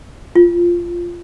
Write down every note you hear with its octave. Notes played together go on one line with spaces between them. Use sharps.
F4